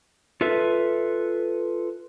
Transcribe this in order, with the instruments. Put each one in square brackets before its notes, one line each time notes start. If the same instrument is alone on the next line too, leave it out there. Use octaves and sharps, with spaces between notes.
[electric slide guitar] F4 A4 B4 E5